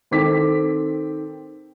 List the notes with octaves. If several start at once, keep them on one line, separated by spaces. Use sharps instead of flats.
D#3 C4 A4 D6 B6